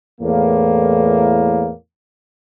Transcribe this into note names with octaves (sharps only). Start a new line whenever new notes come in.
E2 A2 A#3